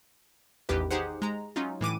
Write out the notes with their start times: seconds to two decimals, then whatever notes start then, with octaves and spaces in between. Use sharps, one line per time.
0.69 A1 E2 D#3 G4 B4
0.91 D#4 G4 G#4 C5 F#5
1.22 G#3 A#5
1.56 F#3 C#4 D#4 F4
1.81 A2 E3 D6 D#7